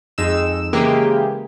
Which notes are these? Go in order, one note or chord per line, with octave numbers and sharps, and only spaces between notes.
F2 G#3 D#4 E6 E7
C#3 E3 G#3 A#3 G4 G#4